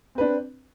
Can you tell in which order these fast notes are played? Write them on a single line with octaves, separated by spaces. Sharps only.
C4 B4 D4